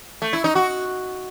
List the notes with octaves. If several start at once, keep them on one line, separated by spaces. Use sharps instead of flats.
A3
E4
D#4
F#4